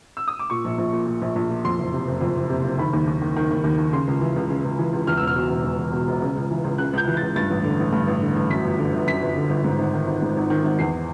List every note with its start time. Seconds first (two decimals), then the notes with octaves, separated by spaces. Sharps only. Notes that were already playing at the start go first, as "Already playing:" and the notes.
0.17 E6
0.28 D#6
0.39 D6
0.50 A#2 C#6
0.65 A#1
0.78 A#1
0.93 A#2
1.07 A#2
1.22 A#1
1.36 A#1
1.50 A#2
1.65 F2 C6
1.79 F#1
1.93 C3
2.07 F#1
2.21 F2
2.36 F#1
2.49 C3
2.64 F#1
2.78 D#3 B5
2.93 D#2
3.07 D#2
3.22 D#3
3.36 D#3
3.51 D#2
3.64 D#2
3.78 D#3
3.93 C#3 C6
4.07 C#2
4.21 E3
4.36 C#2
4.50 C#3
4.65 C#2
4.79 E3
4.93 C#2
5.07 E2 F6
5.17 E1 E6
5.27 F6
5.36 B2
5.50 E1
5.64 E2
5.79 E1
5.93 B2
6.07 E1
6.22 C#3
6.36 C#2
6.51 E3
6.64 C#2
6.78 C#3 F#6
6.93 C#2 G6
7.08 E3
7.17 C#2 A6
7.36 G2 A6
7.50 A1
7.64 D3
7.79 A1
7.93 G2
8.08 A1
8.21 D3
8.36 A1
8.50 F#2 B6
8.65 G1
8.78 D3
8.93 G1
9.07 F#2 B6
9.22 G1
9.36 D3
9.50 G1
9.64 G#2
9.78 G#1
9.94 D#3
10.07 G#1
10.22 G#2
10.37 G#1
10.50 D#3
10.64 G#1
10.79 E2 C7